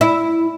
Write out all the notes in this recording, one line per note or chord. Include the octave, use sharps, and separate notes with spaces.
E4